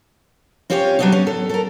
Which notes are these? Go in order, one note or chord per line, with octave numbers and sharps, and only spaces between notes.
C4 C#4 F4 G4 B4 C#5
F#3 G3 B3 C4 D4 D#4
C#4
A4
A4 A#4